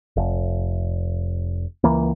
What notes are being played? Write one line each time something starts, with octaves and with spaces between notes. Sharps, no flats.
F1
C#2 E3 A#3